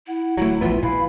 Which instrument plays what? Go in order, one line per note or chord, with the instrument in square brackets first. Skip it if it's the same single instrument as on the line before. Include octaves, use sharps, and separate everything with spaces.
[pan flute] E4 [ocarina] F#5
[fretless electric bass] D1 A3 [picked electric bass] F#3 [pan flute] E4
[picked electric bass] A#1 E3 B3 [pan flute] F4
[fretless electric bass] A#2 [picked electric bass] E3 [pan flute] F5 [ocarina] B5